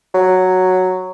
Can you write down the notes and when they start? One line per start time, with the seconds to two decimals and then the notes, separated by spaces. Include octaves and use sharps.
0.15 F#3